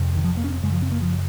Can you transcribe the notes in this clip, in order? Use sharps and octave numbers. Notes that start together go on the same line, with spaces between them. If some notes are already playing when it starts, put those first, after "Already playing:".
Already playing: F2 C3
D#3
F3
A#3
C#4
C4
F#2 C#3 G#3
F3
C4
A#3
F3